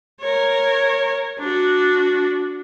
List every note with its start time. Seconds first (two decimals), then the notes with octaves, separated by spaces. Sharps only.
0.20 A#4 C#5
1.39 D4 F#4